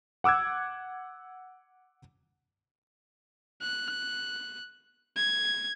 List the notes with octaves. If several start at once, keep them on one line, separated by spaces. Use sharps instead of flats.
F#5 D6 E6 F#6 G#6
F#6
G#6